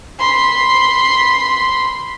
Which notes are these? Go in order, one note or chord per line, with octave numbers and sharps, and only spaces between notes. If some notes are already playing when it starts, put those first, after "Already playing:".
B5 C6